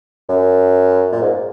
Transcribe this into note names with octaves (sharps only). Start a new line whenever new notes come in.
F#2
A#2
G#2